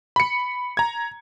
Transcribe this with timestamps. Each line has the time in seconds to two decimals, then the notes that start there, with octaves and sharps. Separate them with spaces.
0.16 B5 C#7
0.77 A#5 G#6